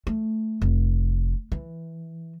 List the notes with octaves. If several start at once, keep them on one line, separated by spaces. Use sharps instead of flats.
A3
F1
E3